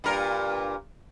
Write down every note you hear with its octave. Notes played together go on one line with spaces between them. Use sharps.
G2 A#2 A#4